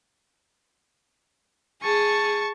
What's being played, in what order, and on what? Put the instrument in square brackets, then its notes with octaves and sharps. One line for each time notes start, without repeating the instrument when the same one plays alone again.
[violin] G#4 [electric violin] A5 C#6